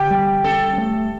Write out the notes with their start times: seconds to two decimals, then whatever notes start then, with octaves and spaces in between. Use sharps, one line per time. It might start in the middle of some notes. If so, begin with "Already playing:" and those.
Already playing: D3 G4
0.11 G3
0.44 C#4 A4
0.78 A3